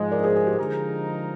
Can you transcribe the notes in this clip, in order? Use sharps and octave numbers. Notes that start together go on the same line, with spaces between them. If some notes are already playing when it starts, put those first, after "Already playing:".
Already playing: G#2 F3 G#3 C5 D#5
A#4 D5
G#4 C5
G#4
G4
D3 F3 G#3 D#4 G#4 A#4